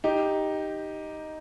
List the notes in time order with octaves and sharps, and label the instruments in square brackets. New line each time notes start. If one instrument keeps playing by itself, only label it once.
[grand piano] D#4 G4